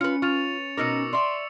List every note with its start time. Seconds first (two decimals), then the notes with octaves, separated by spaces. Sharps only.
0.01 C#4 F4 B4 C#7
0.22 F4 C#6 A6 F7
0.77 B2 D#4 A#4 D6 E6 C#7
1.13 D5 E5 C6